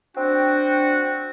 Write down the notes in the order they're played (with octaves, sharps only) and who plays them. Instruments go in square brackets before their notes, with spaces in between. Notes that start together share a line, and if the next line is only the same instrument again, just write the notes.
[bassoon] C4 [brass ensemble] D4 G5 [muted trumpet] F#4